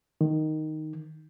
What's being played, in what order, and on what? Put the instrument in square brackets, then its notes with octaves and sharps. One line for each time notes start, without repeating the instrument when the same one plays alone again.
[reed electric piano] D#3